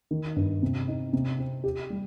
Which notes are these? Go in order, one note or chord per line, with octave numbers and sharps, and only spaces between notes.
D#3
G2
C3
D#4
C3
C4
G4
G3